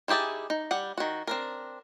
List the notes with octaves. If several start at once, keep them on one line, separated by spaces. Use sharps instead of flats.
D#3 E4 G4 G#4 A5
D#4
G3 F#5
D#3 F#4
C4 D4 A#4